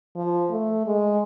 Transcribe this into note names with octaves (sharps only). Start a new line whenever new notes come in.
F3
A3
G#3